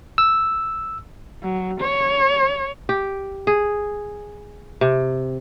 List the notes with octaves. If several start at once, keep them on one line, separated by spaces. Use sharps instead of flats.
E6
F#3
C#5
G4
G#4
C3